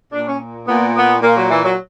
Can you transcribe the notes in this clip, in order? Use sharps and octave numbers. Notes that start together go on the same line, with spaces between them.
A#2 D4
C#4
A#2 B3
B3
A#2 A#3
F#3
E3
F#3